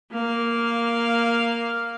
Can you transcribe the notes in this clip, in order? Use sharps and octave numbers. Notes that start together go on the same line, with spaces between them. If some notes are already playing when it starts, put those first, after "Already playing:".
A#3 F5